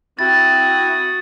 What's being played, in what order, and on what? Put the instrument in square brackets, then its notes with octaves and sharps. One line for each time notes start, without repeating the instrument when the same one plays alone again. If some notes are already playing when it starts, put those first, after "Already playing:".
[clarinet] C4 [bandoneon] E4 [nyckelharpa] F#4 D#6 [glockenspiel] A6